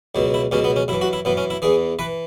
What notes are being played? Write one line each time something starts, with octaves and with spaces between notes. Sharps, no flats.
C#2 B2 F#3
E4
C#2 B2 F#3 C#4
B3
C#4
F#2 E3 E4
F#4
E4
F#2 E3 B3
C#4
E4
E2 E3 G#4
E3 B4